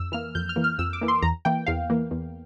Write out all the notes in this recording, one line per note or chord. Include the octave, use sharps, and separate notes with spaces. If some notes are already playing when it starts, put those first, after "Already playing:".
Already playing: F2 E6
E3 A#3 F6
F2 G6
F6
E3 A#3
F6
F2 E6
D6
E3 A#3
C6
E2 A#5
E3 A#3 G5
E2 F5
E3 A#3
E2